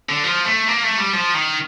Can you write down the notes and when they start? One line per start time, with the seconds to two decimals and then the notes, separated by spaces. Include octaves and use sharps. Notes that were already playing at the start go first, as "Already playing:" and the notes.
0.09 D3
0.24 F3
0.45 A3
0.68 A#3
0.83 A3
0.98 G3
1.13 F3
1.34 D#3